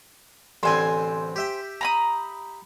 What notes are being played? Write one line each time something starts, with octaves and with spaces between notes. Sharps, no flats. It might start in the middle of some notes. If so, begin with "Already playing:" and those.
A1 D3 C4 C5 G#5
G4 E5 G5
A#5 B5 D#6